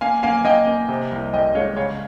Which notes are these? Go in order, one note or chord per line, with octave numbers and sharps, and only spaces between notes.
A#3 F5 G#5
A#3 F5 G#5
A#3 D#5 G5
A#3
C3
C2
C2 D#5 G5
G#3 C#5 F5
C#3 C#5 F5